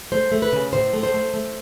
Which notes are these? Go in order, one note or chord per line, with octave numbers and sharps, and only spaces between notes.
A3 C5
A3
B4
C#3
A2 C5
A3
C5
A3
A3